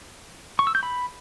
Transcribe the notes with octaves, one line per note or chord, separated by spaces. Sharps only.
C#6
E6
G6
B5